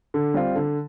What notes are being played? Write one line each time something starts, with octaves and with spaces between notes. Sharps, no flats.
D3
G3 C4 F4
D3